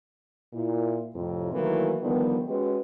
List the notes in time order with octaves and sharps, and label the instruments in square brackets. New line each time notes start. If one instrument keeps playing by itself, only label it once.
[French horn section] A#2 E4
F2 A2 C3
D#3 E3 F#3 A3 A#3 E4
D3 D#3 F3 G3 B3
G#3 C#4 F#4 G4 B4